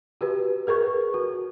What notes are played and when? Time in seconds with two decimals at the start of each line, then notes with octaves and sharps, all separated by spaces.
0.21 F#4 G4 B4
0.67 G#4 A#4 B4 C#6
1.14 F#4